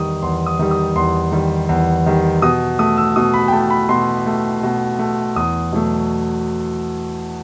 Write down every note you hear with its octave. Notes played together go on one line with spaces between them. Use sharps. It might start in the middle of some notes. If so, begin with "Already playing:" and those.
Already playing: E2 D#3 G3 D#6
E2 C6
D#6
D#3 G3
D#6
E2 C6
D#3 G3
E2
D#3 G3
B2 D#6
A3 D#6
E6
B2 D#6
B5
G5
A3 A5
B5
B2 C6
A3
B2
A3
E2 D#6
B2 F#3 A3